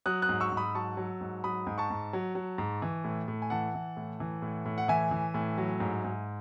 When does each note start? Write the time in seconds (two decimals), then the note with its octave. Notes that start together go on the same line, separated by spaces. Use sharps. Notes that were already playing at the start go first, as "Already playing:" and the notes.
0.06 F#3 D#6 F#6
0.22 D#6 F#6
0.29 G#2
0.40 C#6 E6
0.52 G#2
0.57 B5 D#6
0.74 F#3 A5 C#6
0.97 F#3
1.21 G#2
1.44 F#3 B5 D#6
1.67 G#2
1.78 A5 C#6
1.90 G#2
2.13 F#3
2.35 F#3
2.58 G#2
2.82 E3
3.04 A2
3.28 A2
3.42 G#5
3.50 E3 F#5 A5
3.74 E3
3.97 A2
4.20 E3
4.42 A2
4.65 A2
4.78 F#5
4.88 E3 E5 G#5
5.11 E3
5.34 A2
5.58 F#3
5.80 G#2
6.04 G#2